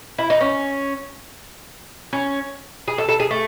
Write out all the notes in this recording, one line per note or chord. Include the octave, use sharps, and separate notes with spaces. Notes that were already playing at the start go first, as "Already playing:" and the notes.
E4
D#4
C#4
C#4
G#4
A4
A4
G#4
A3